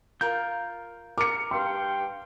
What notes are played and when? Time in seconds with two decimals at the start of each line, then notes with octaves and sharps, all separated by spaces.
0.21 F4 A#4 G6
1.18 A#4 D6 C#7
1.51 G2 F5 G5 C6